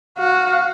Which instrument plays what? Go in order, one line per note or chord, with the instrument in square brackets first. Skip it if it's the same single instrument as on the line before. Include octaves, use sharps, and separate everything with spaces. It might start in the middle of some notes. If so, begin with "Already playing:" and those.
[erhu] F#4 [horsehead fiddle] F5